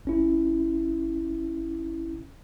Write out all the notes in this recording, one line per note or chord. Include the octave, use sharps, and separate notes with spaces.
G1 C#4 E4